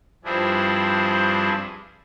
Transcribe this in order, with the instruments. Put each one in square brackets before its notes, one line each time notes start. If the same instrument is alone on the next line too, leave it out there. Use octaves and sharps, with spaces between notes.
[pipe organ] G2 F3 C4 D4 E4 G#4